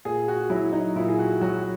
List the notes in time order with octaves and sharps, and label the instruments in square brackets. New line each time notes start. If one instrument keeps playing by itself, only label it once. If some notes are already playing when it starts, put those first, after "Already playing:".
[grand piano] A#2 G#4
F#4
F#3 E4
D#4
A#2 E4
G#4
F#4
F#3 F#4